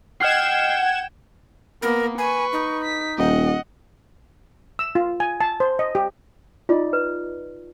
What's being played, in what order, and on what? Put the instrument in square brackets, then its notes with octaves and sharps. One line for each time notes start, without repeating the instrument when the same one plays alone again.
[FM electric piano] D#5 F6 C7 [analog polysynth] F#5 G#6 E7 [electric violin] G5
[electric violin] A#3 B3 [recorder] A#4
[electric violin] B4 C#6 [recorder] G#5
[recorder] D#4
[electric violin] B6
[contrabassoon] D#1 [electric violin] D#5 F#5
[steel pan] E6
F4
G#5
A5
C5
D#5
G4
[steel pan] D#4 D5 [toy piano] F4
[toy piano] B4